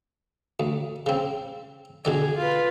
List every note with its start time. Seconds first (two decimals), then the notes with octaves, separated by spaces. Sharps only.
0.60 D2
1.06 C#3 C4
2.05 B2 D3 G#4 D5
2.37 F4 B4